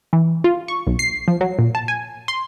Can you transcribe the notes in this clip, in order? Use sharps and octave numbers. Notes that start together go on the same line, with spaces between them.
E3
F4
C#6
B1
C7
F3
F#3
A#2
A5
G#5
C6